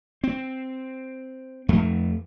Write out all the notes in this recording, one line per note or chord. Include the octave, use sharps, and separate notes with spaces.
C4
F2 A3